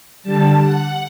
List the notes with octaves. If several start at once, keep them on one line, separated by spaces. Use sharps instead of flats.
D3 G3 A5
F#5